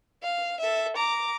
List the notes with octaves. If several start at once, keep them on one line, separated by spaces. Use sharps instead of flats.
F5
A4 E5
A#5 D6